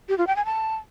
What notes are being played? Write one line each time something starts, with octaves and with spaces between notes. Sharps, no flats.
G4
F4
G5
G#5
A5